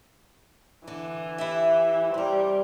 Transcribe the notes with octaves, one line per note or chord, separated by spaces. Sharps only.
D3 E3
E4 G4 E5
C3 G3 A#4